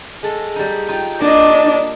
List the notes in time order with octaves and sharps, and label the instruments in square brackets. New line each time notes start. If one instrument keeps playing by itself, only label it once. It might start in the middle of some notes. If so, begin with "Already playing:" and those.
[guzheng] G#3 A4
G3 D#4
[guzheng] D#4 F4 [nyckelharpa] G5
[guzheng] A#3 [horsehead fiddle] D4 [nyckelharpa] D#5 A5